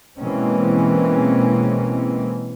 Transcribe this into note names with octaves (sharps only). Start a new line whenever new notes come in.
B2 E3 G#3 A#3 C4 C#4